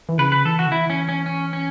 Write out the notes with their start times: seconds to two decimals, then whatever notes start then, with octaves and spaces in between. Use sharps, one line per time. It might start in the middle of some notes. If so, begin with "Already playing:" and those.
0.09 E3
0.18 C#3 B4
0.32 B4
0.45 E3 A4
0.59 F#4
0.66 C#3
0.72 E3 E4
0.90 C#4
1.09 C#4
1.26 C#4
1.53 C#4